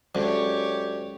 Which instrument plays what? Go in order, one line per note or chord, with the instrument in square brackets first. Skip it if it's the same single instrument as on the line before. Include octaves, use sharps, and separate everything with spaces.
[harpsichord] D2 [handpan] F#3 G#3 C#4 [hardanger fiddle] G4 C#5